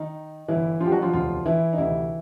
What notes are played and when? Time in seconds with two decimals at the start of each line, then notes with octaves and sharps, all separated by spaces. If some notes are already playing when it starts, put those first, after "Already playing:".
Already playing: D#3 D#4
0.48 G1 G2 D3 E3 E4
0.80 F3 F4
0.86 G4
0.91 F#3 F#4
1.02 F3 F4
1.13 E1 D2 C3 D#3 F3 F4
1.46 E3 E4
1.73 D#4
1.78 D2 C3 D#3 E3 E4